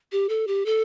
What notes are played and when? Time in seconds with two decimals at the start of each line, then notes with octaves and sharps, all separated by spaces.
0.12 G4
0.29 A4
0.47 G4
0.66 A4